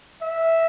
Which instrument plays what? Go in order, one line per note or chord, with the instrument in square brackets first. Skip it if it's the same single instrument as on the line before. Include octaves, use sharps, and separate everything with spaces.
[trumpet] E5